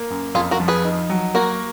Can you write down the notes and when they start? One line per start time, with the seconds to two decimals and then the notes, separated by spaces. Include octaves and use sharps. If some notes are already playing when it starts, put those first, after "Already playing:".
Already playing: A#3
0.10 F#2
0.34 F2 F4 G#4
0.51 F#4 A#4
0.60 F3
0.68 G#4 B4
0.85 D#4
1.10 F#3
1.35 A#3 F#4 A#4